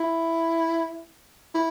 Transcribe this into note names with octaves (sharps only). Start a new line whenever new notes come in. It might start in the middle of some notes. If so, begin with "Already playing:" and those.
Already playing: E4
E4